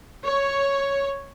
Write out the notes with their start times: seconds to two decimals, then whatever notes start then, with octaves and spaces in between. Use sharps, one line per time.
0.23 C#5